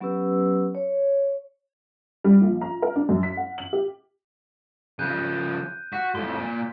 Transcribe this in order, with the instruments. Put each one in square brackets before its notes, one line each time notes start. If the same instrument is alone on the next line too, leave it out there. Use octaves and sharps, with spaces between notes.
[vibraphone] F#3 B3 C#4 G4 B4 E6
C#5
[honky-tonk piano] G3
A#1
A#5
A#4
D4
F#2
B6
F#5
F#7
G4
[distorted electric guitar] C#3 F3 [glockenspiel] F#6 G6 D#7
[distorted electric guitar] F#4 [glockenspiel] B6
[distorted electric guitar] F2 A2 [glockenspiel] C6
[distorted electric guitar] A#2